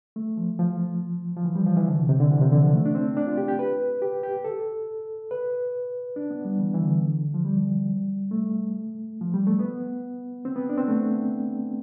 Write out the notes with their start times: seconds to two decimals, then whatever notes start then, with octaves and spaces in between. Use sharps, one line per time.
0.16 A3
0.37 F3
0.59 F3
1.36 F3
1.45 E3
1.55 G3
1.66 F3
1.77 E3
1.87 D3
1.98 C3
2.09 C3
2.20 D3
2.31 E3
2.41 C3
2.52 D3
2.62 F3
2.73 A3
2.85 D4
2.95 C4
3.17 D4
3.27 F4
3.38 G4
3.48 G4
3.59 B4
4.02 G4
4.23 G4
4.44 A4
5.31 B4
6.16 D4
6.30 B3
6.45 G3
6.59 E3
6.74 E3
6.81 D3
7.34 F3
7.45 G3
8.31 A3
9.21 F3
9.34 G3
9.47 A3
9.59 B3
10.45 C4
10.56 B3
10.69 D4
10.78 C4
10.88 A3